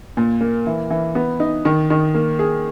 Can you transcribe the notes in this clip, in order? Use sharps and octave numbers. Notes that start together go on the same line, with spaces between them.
A#2
A#3
E3
E3
B3
D#4
D#3
D#3
A#3
G#4